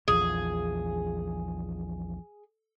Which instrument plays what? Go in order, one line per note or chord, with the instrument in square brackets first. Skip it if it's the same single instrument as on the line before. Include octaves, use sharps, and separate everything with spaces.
[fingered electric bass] A#1 E2 F3 [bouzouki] G#4